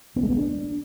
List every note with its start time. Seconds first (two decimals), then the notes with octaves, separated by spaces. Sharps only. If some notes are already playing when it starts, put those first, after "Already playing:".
0.16 B3
0.23 G#3
0.30 B3
0.37 D4